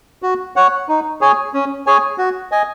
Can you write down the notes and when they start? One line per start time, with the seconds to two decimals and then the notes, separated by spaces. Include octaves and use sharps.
0.22 F#4
0.56 C#5 F#5
0.89 D#4
1.21 G#4 C#5 G#5
1.53 C#4
1.87 G#4 C#5 G#5
2.18 F#4
2.52 D#5 G#5